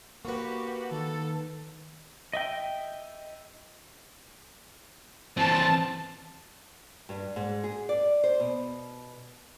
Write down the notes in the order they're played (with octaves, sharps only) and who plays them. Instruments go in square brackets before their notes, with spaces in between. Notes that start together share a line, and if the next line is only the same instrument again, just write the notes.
[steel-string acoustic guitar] A#3 B4 [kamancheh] F#4 G4 [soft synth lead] C#6
[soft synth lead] D#3 [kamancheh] A4
[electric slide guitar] D#5 E5 G5
[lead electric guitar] E3 C4 [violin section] A5
[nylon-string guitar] G2
G#2
G#4
D5
C5
B2